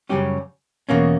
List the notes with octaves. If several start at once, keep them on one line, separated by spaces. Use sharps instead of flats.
F#2 C#3 G3 C#4 G4
E2 B2 A#3 C#4